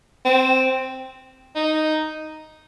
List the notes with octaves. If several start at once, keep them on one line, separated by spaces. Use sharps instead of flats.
C4
D#4